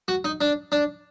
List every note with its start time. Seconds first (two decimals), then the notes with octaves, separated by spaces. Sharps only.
0.08 F#4
0.24 D#4
0.41 D4
0.72 D4